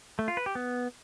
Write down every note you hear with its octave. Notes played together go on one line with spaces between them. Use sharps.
A3
F4
B4
G4
B3